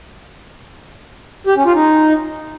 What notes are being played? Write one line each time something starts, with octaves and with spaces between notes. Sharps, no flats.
G4
C#4
F4
D#4